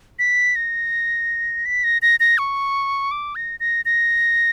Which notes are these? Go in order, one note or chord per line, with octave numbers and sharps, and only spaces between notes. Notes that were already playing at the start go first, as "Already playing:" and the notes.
B6
A#6
B6
A#6
A#6
A#6
C#6
D6
A#6
A#6
A#6